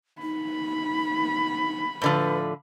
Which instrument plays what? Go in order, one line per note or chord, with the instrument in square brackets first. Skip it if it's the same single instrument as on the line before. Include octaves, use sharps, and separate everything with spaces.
[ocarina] D#4 [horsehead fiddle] B5
[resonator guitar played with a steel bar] A2 D3 F3 [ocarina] B4